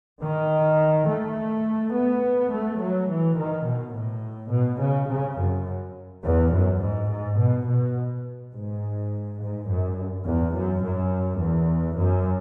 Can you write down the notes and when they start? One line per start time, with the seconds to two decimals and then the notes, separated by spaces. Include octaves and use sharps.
0.22 D#3
1.08 A3
1.93 B3
2.51 A3
2.80 F#3
3.08 E3
3.37 D#3
3.66 B2
3.94 A2
4.51 B2
4.80 C#3
5.08 C#3
5.38 F#2
6.23 E2
6.52 F#2
6.80 G#2
7.10 G#2
7.38 B2
7.66 B2
8.53 G#2
9.39 G#2
9.68 F#2
10.25 E2
10.54 F#2
10.82 F#2
11.39 E2
11.97 F#2